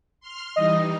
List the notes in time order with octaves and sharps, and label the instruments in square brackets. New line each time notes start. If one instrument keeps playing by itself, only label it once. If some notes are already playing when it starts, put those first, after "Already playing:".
[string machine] C6 F6
[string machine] E3 G3 D#4 [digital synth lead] D#5